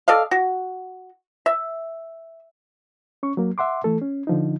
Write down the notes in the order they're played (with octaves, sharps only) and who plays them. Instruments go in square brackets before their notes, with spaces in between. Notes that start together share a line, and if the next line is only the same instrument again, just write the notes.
[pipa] A4 D5 D#5 F5
F#4
E5
[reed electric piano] C#4 C#6
F#3 A#3
E5 F#5 C6 D6
E3 A3 A4
C#4
D3 F3 D#4